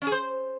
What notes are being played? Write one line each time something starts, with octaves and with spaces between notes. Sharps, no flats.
C#4
G#4
C5